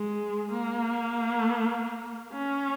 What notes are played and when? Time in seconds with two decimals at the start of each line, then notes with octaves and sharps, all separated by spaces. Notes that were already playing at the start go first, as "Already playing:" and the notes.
Already playing: G#3
0.52 A#3
2.32 C#4